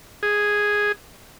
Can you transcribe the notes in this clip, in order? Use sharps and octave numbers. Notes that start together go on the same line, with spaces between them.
G#4